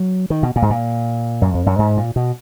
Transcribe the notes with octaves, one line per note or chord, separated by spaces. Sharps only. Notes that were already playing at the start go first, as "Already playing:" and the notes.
Already playing: F#3
D#3
B2
A#2
G#2
A#2
F#2
F2
F#2
G#2
A#2
B2